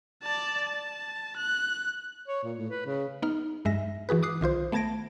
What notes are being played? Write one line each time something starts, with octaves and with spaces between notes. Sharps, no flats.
D5 A5
A5
F#6
C#5
A#2
A2
B4
C#3
B3 D#4 F6
G2 G#3 E5 A#6
E3 F#4 G#4 B4
D6 D#6 F#6 C7
B1 D#3 F4 C5
A3 B3 A5 G#6 A#6 D7